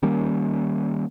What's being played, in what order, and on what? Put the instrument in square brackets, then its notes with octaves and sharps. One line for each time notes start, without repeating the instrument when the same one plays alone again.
[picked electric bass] D#3 G3 A#3 C#4